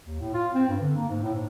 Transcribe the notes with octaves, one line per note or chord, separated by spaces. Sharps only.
D#2
A2
F4
C4
G2
D3
A#3
G#2
A2
G#2